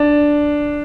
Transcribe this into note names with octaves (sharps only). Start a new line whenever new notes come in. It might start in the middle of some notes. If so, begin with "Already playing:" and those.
Already playing: D4